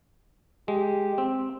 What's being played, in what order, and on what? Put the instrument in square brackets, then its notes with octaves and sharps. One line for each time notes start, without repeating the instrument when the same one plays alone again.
[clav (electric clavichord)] G#3 [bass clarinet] G4
[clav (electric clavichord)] C4